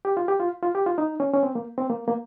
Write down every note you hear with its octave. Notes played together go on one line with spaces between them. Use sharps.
G4
F4
G4
F4
F4
G4
F4
D#4
C#4
C#4
C4
A#3
C4
A#3
A#3